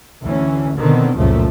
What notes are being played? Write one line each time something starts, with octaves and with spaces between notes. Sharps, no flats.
D2 E3 C#4
B2 D3 D#3 B3 C4
F#1 C#2 A#2 F3 A3